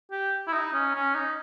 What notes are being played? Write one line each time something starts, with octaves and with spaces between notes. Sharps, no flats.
G4
E4
D#4
C#4
C#4
D#4